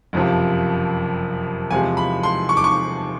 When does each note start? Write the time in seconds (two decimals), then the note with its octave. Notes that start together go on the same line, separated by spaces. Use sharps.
0.13 F#1 F2 C3 F3
1.71 E2 C3 F3 G#3 G#5
1.97 B5
2.23 C6
2.49 C#6
2.57 D6
2.64 C#6